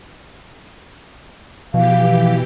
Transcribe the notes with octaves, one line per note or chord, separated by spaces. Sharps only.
B2 E3 F3 G4 F5